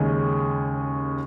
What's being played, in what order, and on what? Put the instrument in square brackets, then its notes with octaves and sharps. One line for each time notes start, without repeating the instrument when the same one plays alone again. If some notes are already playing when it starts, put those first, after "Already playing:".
Already playing: [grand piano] D#2 C#3 G#3 C#4 G#4